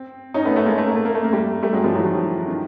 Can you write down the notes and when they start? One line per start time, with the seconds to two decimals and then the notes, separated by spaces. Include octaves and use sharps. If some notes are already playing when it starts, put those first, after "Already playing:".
Already playing: C4
0.34 C#4 D#4
0.45 A3 B3
0.56 A3 B3
0.66 G#3 A#3
0.78 A3
0.87 A#3
0.96 A3
1.05 A#3
1.15 A3
1.24 A#3
1.32 G3 A3
1.62 G3 A3
1.73 F#3 G#3
1.84 F3 G3
1.95 E3 F#3
2.05 D#3 F3
2.48 D#3